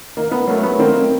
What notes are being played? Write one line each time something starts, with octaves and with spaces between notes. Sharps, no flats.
D#3 A#3
B3
F#3 A3 A#3
B3
D#3 A#3 C4